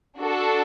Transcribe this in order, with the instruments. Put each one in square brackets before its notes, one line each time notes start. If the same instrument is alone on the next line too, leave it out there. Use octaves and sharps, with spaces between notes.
[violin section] D4 F#4 A4